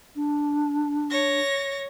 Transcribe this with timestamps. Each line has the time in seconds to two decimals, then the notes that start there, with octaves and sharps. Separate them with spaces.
0.15 D4
1.10 C#5 A#6